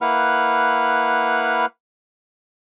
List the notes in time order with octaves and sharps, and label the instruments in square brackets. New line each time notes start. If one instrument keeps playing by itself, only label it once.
[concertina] A#3 E4 B4 F#5 F6